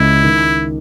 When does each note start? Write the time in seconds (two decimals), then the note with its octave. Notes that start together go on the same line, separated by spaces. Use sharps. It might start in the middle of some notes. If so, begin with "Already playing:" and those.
Already playing: C#2 E4
0.23 D#3